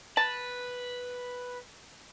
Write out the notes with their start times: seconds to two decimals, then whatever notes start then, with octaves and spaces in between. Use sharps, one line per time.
0.17 B4 A5